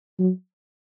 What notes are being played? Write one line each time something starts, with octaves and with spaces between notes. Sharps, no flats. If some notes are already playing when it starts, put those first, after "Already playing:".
F#3